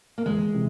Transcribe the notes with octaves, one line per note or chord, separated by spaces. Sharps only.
A#3
E2 G#3
C3 E3